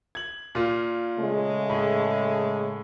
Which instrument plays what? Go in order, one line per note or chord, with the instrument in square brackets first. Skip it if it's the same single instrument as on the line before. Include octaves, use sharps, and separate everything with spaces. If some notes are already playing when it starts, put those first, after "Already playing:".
[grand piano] G#6 F#7
A#2 F4
[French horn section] C#3 G#3 A3
[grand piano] A2